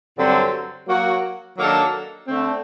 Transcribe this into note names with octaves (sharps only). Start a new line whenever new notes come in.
G2 D3 F#3 C4
F#3 A#3 F#4
D#3 F#3 A#3 D4 A4
D3 A3 C4